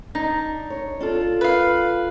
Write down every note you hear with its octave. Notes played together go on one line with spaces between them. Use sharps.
D4 D#4
C#5
D4 F4 A4
B4 F5